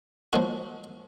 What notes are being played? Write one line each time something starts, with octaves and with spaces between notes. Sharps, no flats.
F3 A#3 D#4 F#4